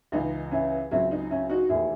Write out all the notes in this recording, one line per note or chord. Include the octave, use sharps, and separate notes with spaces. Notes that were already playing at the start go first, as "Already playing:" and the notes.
C#2 C#3 E3 D#4
C#4 E4
C#2 C#3 F#3 C4 C#4 E4
D#4
C#4 E4
D#4 F#4
E1 D#2 D#3 A3 E4 G#4